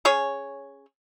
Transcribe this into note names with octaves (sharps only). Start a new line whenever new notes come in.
C#4 G#4 C#5